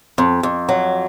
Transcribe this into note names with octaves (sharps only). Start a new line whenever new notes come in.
F2
F2
F#3